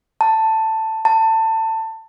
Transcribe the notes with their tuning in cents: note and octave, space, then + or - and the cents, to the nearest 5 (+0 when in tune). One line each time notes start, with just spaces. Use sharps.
A5 +10
A5 +25